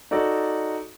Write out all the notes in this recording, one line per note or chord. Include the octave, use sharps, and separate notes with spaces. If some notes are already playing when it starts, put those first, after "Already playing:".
D#4 F#4 A4 D5